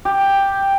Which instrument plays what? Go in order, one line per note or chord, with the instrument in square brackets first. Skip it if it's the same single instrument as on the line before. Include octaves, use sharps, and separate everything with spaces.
[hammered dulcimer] G4